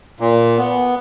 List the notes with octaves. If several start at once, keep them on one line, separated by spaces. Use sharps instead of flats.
A#2
B3